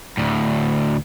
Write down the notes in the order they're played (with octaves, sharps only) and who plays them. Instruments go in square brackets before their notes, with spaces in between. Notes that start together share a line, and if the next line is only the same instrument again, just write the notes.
[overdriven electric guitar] D2 A2